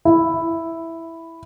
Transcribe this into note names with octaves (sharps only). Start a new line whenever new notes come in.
E4